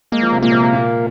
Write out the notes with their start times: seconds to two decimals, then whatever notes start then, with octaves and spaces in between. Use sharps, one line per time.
0.12 G#3 A#3
0.22 F3
0.32 C3
0.42 A#2 A#3
0.52 C3
0.62 C3
0.73 A#2